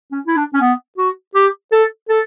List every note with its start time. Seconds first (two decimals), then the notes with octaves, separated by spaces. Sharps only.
0.12 C#4
0.27 E4
0.36 D4
0.54 C#4
0.61 B3
0.98 F#4
1.35 G4
1.72 A4
2.09 A4